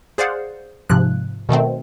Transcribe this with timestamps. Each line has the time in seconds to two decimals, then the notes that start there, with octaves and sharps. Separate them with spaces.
0.18 G#4 C5 D5 F5 F#5
0.89 G#2 C3 F3 F#6
1.49 B2 D#3 A3 C4